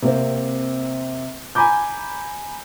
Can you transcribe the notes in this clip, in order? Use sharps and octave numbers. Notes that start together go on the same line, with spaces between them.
C3 A#3 C4
G#5 A#5 B5 D6 G6